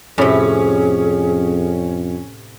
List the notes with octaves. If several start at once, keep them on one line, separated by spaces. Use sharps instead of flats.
F2 A2 C3 C#4 G#4